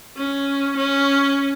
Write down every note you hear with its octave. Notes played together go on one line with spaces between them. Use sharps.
C#4
C#4